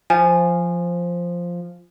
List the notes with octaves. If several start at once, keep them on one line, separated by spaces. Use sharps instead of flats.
F3 G#5